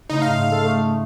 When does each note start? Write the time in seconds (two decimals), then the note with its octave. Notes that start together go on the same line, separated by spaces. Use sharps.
0.10 C#3 A3 D#4 D#5 C6
0.22 G#2 F5 G6
0.51 A4
0.64 A3 D#6